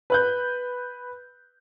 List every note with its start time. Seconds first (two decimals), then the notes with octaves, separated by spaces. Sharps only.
0.10 B4 F#6 G6